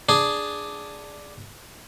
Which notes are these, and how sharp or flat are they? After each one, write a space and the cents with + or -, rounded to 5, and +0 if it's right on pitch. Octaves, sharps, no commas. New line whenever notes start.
D4 +0 G#4 +0